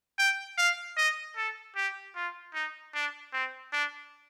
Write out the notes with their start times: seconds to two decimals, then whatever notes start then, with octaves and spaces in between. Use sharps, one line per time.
0.19 G5
0.58 F5
0.97 D#5
1.37 A4
1.76 G4
2.15 F4
2.54 D#4
2.94 D4
3.33 C4
3.73 D4